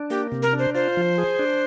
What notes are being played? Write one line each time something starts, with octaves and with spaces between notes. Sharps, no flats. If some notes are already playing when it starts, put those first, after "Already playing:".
Already playing: D4
A#3 G4
C3
A#4
D4
C5
F4 C5
F3
G#4
D4